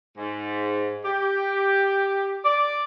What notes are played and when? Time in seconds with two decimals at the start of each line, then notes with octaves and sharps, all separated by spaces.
0.16 G#2
1.03 G4
2.43 D5